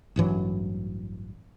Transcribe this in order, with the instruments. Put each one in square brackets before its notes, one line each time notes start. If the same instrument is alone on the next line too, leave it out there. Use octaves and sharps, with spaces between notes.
[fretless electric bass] A1 G2 E3 F#3